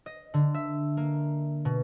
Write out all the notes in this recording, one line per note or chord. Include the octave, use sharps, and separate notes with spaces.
D#5
D3
E5
A#3
B2